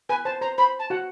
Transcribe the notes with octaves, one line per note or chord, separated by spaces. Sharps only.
B4 G#5
C5 A5
C5 A#5
C5 B5
A5
F#4 F#5